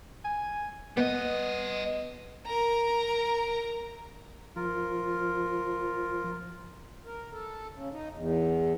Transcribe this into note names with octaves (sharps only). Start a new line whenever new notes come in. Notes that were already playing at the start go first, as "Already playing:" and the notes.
G#5
G3 B3 D#5
A#4 A#5
F3 F4 A#4
A#4
A4
C#3
D#4
E2